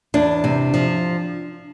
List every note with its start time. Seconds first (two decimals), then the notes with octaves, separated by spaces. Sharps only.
0.14 E2 D4
0.44 C3
0.74 F3